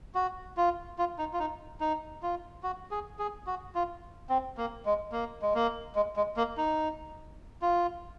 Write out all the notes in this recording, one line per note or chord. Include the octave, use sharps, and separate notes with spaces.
F#4
F4
F4
D#4
F4
D#4
D#4
F4
F#4
G#4
G#4
F#4
F4
C4
A#3
G#3
A#3
G#3
A#3
G#3
G#3
A#3
D#4
F4